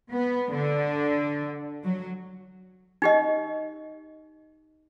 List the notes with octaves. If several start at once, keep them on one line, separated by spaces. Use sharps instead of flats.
B3
D3
F#3
D#4 G4 D#5